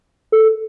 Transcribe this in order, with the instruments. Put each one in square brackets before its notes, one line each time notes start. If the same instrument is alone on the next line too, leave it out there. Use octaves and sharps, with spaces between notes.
[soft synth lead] A4